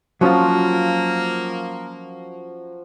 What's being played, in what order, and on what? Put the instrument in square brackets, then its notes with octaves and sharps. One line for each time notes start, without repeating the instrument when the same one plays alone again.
[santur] F3 F#4 D#6 [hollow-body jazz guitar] F#3 C#4 F4 [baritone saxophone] A#3